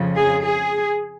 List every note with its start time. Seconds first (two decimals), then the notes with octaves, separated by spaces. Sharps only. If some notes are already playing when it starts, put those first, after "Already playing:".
Already playing: F2 C#3 F3
0.17 G#4
0.44 G#4